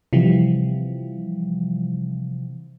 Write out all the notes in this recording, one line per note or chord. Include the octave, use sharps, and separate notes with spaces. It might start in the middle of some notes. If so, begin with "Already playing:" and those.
C3 E3 F3 G3